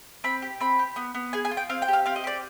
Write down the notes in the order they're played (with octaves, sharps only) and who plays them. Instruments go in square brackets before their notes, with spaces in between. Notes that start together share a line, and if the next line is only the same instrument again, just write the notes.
[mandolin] C4 B5
G4
C4 B5
G4
B3
B3
G#4 G#5
G#5
F4
G5
C4 F5
G5
G4
F5
C4 F5
D#5
G4 D5